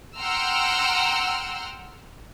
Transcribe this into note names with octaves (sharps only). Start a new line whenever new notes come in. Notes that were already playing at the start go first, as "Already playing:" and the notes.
F#5 G5 A#5 C6 E6 F6